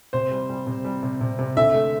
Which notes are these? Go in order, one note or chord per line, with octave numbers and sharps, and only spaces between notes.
C3 C5
G3
G3
C3
G3
C3
C3
C3
D3 E5
A3